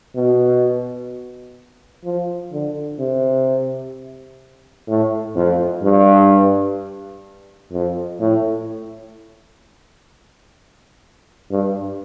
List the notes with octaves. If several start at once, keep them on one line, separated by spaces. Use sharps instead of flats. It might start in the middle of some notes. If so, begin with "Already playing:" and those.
B2
F3
D3
C3
A2
F2
G2
F2
A2
G2